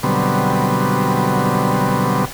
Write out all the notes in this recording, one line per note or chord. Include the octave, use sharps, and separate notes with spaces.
B2 D3 F#3 G3 B3 C4